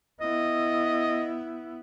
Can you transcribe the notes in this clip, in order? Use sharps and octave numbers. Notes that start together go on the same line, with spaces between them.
B3 E4 D#5